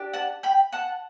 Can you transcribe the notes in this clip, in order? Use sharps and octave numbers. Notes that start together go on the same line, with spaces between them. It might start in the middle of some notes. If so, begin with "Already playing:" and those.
Already playing: D4 G4
F#5 A5
G5 B5
F#5 A5